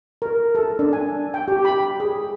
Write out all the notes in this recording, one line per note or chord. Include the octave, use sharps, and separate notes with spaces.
A#4
A4
D4
G#5
G5
G4
B5
G#4